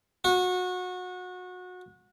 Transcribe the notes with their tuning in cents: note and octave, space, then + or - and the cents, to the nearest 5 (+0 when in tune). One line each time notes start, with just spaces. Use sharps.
F#4 -25